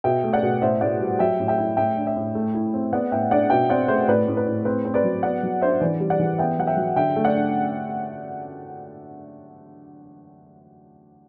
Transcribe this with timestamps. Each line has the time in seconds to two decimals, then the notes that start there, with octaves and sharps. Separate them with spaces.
0.04 B2 E5 G5
0.24 A3
0.33 D5 F#5
0.43 B2
0.62 A2 C5 E5
0.81 A2 D5 F#5
1.01 G3
1.19 F#3 E5 G5
1.40 A2
1.48 E5 G5
1.58 E4
1.77 A2 E5 G5
1.97 D4
2.07 E5 G5
2.16 A2
2.35 A3
2.54 E4
2.74 C4
2.93 B3 D5 F#5
3.12 A2 E5 G5
3.31 D4 D5 F#5
3.50 B2 E5 G5
3.69 C4 D5 F#5
3.88 A3 C5 E5
4.07 A2 B4 D5
4.28 A2
4.37 B4
4.47 A2
4.65 C4 B4
4.85 C4
4.94 B4 D5
5.04 F#3
5.23 B3 D5 F#5
5.43 F#3
5.61 D4 C5 E5
5.81 E3 B4 D5
6.00 G3
6.10 D5 F#5
6.19 E3
6.38 B3 E5 G5
6.58 F#3 F#5
6.67 E5 G5
6.77 F#3
6.96 D3 E5 G5
7.16 A3
7.25 D5 F#5
7.34 D4